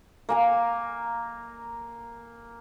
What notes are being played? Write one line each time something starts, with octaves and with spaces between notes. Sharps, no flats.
A#3 G#5 A#5